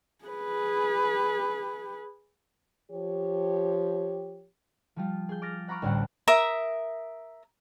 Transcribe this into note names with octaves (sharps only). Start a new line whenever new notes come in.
G#4 B4
F3 G4 C#5
F3 G3 F4
G#4 G6
D6 F6 A6 A#6
F#5 A#5 B5 C#6 D6 F6
A1 D2 A2 G3 F#5
A#4 E5 D#6